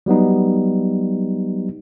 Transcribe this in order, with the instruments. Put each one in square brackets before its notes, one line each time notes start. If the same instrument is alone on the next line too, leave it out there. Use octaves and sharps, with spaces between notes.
[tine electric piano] F#3 G3 B3 D#4